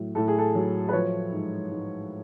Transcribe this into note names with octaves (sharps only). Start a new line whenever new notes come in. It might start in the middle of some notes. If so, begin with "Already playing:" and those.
Already playing: A2 F#3
A2 A4
G#4
A4
F#3
B4
F3 C#5
G#2
G#2